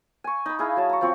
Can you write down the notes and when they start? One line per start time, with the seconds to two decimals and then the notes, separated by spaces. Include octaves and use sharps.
0.24 G#5 C#6
0.46 D#4 B5
0.59 E4 G#4 F5
0.76 F#3 A5
0.90 A#5 C#6
1.01 F3 C4 C#6